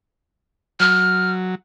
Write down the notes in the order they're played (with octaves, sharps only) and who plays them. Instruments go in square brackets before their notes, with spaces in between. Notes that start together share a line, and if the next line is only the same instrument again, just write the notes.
[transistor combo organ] F#3 [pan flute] F6